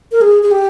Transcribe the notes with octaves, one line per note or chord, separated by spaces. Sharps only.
A#4
G#4
G#4
G4